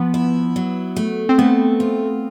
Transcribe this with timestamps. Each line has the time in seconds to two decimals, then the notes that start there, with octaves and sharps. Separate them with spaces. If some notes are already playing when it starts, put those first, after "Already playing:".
Already playing: F3 B3
0.14 E4
0.56 F#3
0.96 A3
1.29 C4
1.38 A3 B3
1.80 F4